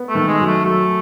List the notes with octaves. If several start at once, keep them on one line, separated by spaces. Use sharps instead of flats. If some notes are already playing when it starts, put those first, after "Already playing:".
Already playing: B3
A3
D#3
G#3
F#2
A3
F#3 A3